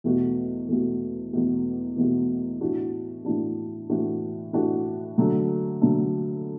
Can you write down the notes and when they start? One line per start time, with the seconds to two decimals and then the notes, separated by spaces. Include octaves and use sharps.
0.04 E2 B2 A3 F#4
0.68 E2 B2 A3 F#4
1.33 E2 B2 A3 F#4
1.97 E2 B2 A3 F#4
2.61 A2 E3 D4 F#4
3.24 A2 E3 D4 F#4
3.89 A2 E3 D4 F#4
4.53 A2 E3 D4 F#4
5.18 D3 F#3 A3 D4
5.82 D3 F#3 A3 D4